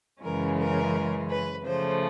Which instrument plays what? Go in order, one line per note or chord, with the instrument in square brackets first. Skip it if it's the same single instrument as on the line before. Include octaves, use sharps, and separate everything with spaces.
[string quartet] F#2 C#3 E3 G#3 C#4 A#4
A#4
B4
C#3 F3 A3 C5